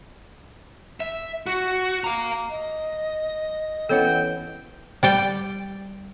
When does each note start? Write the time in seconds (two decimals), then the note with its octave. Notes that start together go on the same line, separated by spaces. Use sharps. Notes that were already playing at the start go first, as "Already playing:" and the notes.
1.00 E5
1.46 F#4
2.04 F5 A#5
2.50 D#5
3.89 E3 B3 C#4 A4 C#5 F#5 G5
5.03 G3 D5 G5